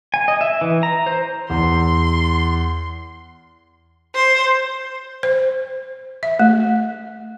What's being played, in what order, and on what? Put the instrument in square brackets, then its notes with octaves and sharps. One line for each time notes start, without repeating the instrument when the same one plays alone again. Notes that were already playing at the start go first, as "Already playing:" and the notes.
[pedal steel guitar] G#5
D#5
E5
E3
A#5
C5
[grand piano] E2 [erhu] C6
[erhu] C5
[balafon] C5
E5
A3